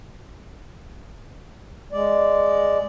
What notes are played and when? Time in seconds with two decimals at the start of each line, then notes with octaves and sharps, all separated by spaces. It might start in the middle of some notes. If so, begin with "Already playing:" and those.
1.92 G#3 D5